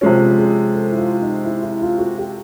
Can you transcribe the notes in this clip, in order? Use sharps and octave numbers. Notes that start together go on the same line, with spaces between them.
C3 F3 G#3 C#4 F#4
G#4
A4
E4
F4
D#4
E4
E4
F4
F#4
G4